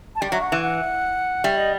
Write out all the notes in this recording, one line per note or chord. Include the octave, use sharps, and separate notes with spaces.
A5
G3 G5
F#3 E5
F#5
E3
F#5
G3 E5
D#5